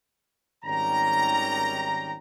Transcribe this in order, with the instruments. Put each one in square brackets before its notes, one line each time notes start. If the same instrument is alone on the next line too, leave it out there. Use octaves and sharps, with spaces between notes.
[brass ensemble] G#1 D#3 G3 C#4 G5 A#5